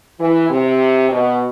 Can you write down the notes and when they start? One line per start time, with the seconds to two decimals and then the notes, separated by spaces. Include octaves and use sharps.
0.19 E3
0.49 C3
1.11 B2